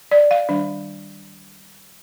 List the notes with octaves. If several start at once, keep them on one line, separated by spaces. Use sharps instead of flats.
D5
F5
D#3 G3 D4